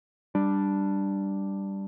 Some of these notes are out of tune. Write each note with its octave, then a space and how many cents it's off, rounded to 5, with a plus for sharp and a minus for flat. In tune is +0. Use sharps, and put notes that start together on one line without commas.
G3 +0 D4 +0